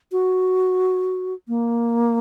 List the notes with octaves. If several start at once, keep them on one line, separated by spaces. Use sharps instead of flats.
F#4
A#3